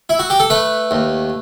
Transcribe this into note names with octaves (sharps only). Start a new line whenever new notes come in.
E4
F#4
G4
A4
A3 B4
D#2